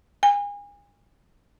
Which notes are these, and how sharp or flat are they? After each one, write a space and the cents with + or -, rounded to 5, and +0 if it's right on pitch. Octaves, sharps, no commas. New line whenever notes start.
G#5 -35